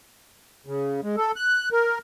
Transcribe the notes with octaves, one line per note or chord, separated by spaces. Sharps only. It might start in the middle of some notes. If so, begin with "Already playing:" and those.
C#3
G#3
A4
F#6
A#4